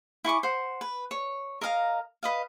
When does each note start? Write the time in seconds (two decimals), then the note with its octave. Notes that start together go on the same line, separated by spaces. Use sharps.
0.24 E4 G#5 C#6 D6
0.43 C5 F#5
0.81 B4
1.11 C#5
1.61 A#4 D#5 F5 A#5
2.23 B4 D#5 F5